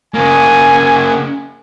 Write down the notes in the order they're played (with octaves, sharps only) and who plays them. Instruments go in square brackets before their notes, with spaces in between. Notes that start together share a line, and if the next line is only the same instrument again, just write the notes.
[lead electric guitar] C#3 A#3 [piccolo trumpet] G#5